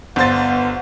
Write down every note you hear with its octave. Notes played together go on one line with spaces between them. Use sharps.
G1 B3 C5 F#5 A6